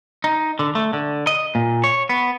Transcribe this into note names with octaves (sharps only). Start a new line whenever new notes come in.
D#4
D3
A3
D3
D#5
A#2
C#5
B3